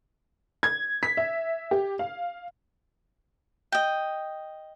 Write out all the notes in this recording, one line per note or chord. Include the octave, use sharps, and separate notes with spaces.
G#6
B6
E5
G4
F5
D#5 G5